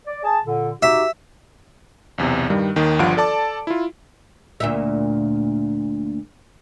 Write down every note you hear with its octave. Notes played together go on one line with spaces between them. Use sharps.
D5
G#4 G#5 A5
A#2 D3
D#4 F#4 G4 E5
B1 E2 C3
G2 D#3 G3
D#2 D#3
G1 G2 F3 F4 F#5 D7
A4 D5 A5 D6
E4 F4
D2 A#2 E5